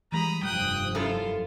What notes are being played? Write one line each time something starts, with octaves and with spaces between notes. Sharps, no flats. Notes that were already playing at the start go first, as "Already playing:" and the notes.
E3 G3 G#3 A#5 B5 D#6
F1 G2 F3 G3 G5 D#6 F#6
F#2 E4 F4 A4